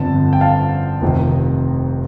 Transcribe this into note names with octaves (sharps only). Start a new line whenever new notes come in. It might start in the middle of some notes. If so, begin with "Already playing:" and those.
Already playing: G1 F2 D3 A5
G5
F5 A5
F1 F2 C3 D#3